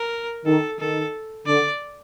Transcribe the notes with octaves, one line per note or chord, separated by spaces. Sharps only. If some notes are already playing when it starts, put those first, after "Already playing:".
Already playing: A#4
D#3 A4
D#3 A4
D3 D5